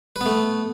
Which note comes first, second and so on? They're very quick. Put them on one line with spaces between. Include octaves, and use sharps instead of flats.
B4 B3 A3